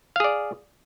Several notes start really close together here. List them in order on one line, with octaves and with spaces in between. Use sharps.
F5 G#4 D5